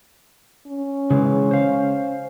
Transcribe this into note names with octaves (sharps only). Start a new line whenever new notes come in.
C#4
C#3 E3 G#3
C5 F5